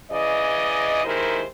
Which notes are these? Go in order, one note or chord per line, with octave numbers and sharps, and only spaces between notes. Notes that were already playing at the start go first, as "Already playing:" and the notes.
C#3 E3 D5 D#5
D#2 D#3 G#3 E4 A#4 C5